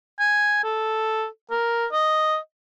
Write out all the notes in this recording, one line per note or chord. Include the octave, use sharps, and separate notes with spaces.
G#5
A4
A#4
D#5